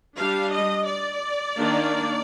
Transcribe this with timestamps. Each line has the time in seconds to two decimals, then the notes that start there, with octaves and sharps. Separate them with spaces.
0.17 G3 D4 F5
0.51 D#5
0.86 D5
1.56 D#3 A#3 D4